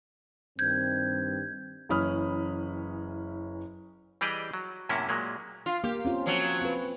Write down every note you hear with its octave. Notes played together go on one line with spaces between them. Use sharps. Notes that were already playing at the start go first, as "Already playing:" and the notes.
G2 D#3 C4 G6 G#6
F#1 E3 C#4 B5 D#6 F6
E3 G3 G4 G#4 D5 D#5
F#3
F#2 A2 C3 A#3 C#4 E4
A#2 F#3 G#3 A#3
F4
A#3 G4
C4 C#4 F4
F3 F#3
C4 B4